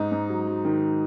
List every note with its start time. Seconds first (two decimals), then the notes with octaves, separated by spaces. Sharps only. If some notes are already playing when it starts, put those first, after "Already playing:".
Already playing: G#2 D#4
0.12 G#2
0.29 F#3
0.47 F#3
0.65 D#3